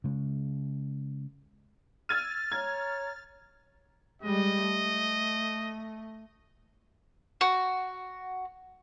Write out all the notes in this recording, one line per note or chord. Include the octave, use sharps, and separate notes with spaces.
C#3 G#3
E6 F6 G#6 A6 D#7
C#5 A#5 G#6
G3 G#3 D#5
A3
F#4